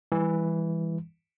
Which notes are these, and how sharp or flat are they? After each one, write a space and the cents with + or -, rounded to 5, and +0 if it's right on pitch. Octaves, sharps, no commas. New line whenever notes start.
E3 +0 G3 +40